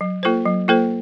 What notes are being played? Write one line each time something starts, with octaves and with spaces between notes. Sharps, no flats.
F#3
A#3 F4 A4 C5
F#3
A#3 F4 A4 C5